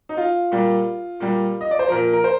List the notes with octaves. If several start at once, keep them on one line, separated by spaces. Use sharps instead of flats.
D#4
F4
A#2 G3
A#2 G3
D#5
D5
C5
A#2 F3 A#4
A#4
C5